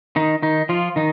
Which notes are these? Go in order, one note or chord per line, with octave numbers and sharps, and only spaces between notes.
D#3 D#4
D#3 D#4
F3 F4
D#3 D#4